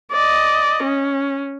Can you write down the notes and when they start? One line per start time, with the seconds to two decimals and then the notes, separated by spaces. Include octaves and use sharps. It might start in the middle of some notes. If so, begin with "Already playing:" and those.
0.11 D5 D#5
0.84 C#4